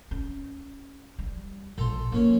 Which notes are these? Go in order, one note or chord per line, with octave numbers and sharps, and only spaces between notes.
C#4
G3
A#1 A4 A#5 C6
F3 A#3 C#4 C#5